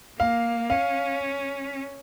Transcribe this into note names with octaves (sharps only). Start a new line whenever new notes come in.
A#3 F5
C#4 F5